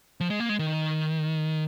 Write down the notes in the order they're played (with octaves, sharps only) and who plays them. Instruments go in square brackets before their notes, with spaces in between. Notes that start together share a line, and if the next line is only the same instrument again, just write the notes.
[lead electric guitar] F3
G#3
A#3
G#3
D#3